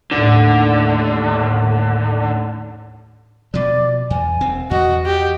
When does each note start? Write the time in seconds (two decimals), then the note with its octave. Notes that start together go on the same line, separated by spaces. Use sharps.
0.11 D#2 A2 D3
3.54 B2 F3 D5
4.10 E2 G#5
4.41 D#1 C4
4.71 E2 F#4 D#5
5.06 G4